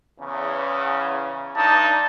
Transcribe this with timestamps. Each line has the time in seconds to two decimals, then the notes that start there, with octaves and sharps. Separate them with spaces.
0.20 E2 C#3
1.57 G2 D4 D#4 A5